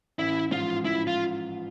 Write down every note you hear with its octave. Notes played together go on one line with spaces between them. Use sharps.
A1 E4
G#2 F3 F4
A1 E4
F4